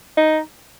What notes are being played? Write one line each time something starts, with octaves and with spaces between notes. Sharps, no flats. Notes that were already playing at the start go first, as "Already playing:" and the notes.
D#4